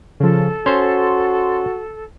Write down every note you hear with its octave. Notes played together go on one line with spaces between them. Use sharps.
C#3 F3 A4
C#4 F#4 C5 C6